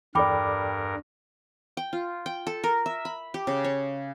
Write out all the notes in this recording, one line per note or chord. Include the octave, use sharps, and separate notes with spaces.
E2 G2 A4 A#4 D5 G5 B5 D6
G5
F4
G5
A4
A#4
E5
B5
G4
C#3
C#5